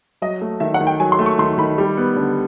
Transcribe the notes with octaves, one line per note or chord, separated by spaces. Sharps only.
F#3 D#5
A3
D#3 E5
F#5
D#3
G5
F#3 G#5
C6
A3
C#6
D#3 C6
D#3 B5
G3
B3
D3